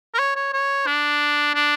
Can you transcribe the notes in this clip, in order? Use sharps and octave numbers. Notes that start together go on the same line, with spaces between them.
A#4
C#5
C#5
C#5
D4
D4